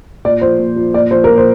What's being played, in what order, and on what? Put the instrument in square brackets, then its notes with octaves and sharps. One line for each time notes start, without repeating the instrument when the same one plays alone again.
[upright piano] A#2 D5
F3 C5
A#2
F3
A#2 D5
F3 C5
A#4
A#2
C5